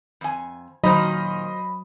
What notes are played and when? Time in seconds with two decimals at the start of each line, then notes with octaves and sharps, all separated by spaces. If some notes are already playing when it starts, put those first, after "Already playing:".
0.21 F2 G#5
0.84 A#2 D#3 F#3 D#4 C5 D#5 B5 D#6